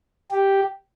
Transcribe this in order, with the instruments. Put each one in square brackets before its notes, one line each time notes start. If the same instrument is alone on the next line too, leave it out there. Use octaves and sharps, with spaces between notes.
[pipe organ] G4